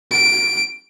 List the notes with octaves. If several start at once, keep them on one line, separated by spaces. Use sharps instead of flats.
D7